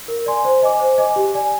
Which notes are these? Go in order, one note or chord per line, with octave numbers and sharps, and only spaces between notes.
A#4
D5 G#5 C6
C5
D#5 G#5 D6
C5
D#5 G#5 D6
G4
D5 G#5